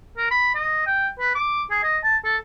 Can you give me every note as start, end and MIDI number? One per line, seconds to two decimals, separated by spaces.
0.17 0.30 70
0.31 0.52 83
0.55 0.84 75
0.87 1.08 79
1.20 1.33 71
1.35 1.63 86
1.70 1.80 68
1.83 1.98 75
2.04 2.17 81
2.24 2.37 69